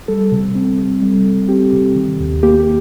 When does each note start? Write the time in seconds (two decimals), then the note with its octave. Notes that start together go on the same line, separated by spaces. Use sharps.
0.08 G3 A4
0.32 C3
0.55 C4
0.79 C3
1.02 G3
1.25 C3
1.49 C4 G4
1.73 C3
1.96 D#3
2.20 D#2
2.43 A#3 G4